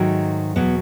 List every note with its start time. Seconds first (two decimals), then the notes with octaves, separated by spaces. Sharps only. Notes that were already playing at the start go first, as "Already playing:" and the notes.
Already playing: G#2 D#3 F#3 A3
0.56 E2 B2 F#3 B3